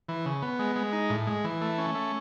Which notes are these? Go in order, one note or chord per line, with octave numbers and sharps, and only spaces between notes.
E3
C#3
B3
G#3
G#3
D#4
A2
G#3
E3
A3
C#4
A3